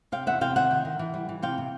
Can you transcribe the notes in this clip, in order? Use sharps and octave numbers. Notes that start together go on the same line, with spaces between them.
C3 F5 G5
E2 E5 F#5
C3 F5 G5
D#3 E5 F#5
D#3
D#3
E3
G3
E3
C3 F5 G5
C3